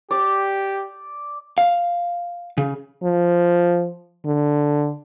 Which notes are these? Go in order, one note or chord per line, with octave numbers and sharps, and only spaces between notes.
G4 D5
F5
C#3
F3
D3